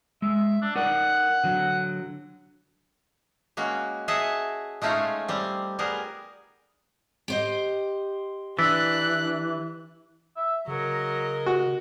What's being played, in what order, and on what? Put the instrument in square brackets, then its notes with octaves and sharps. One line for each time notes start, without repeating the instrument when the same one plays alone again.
[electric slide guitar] G#3 [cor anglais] E5
[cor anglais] D4
[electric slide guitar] D#4 A#4 D5 [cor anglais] F#5
[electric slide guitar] D3 F#3
[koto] G#3 A#3 C#4 F#4
G#4 D#5 E5 F#5 A5
G#3 A3 C#4 D#4 F4 C#5
G3 C4
G3 B3 G#4 A#4
[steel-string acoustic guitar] G4 C5 D#5
[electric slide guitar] E3 [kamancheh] D4 F#6 [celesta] E6 A6 B6
[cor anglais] E5
[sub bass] C#3 [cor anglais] F#3 [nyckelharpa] A#4 D#5
[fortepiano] F#4